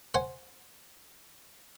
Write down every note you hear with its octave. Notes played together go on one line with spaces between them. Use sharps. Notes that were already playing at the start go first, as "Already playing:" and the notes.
C5 F#5 G#5